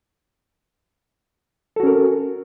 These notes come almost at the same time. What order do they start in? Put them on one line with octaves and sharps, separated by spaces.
A4 F#4 C#4 A#4